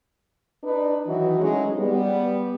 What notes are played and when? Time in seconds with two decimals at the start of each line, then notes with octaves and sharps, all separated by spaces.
0.64 D4 D#4 B4
1.06 D#3 E3 F#3 D#4 E4 F#4
1.41 F#3 G#3 A3 C#4 D#4 G#4
1.77 G3 B3